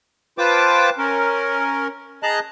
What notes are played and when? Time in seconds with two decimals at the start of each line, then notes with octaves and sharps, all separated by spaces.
0.38 F4 B4 C5 G5 A5 D6
0.98 C#4 A#4
2.23 G#4 D#5 A5 A#5 F#6